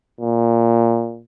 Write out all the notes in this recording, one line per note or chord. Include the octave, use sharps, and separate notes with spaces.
A#2